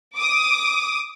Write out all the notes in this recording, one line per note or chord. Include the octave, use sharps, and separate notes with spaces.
D6 D#6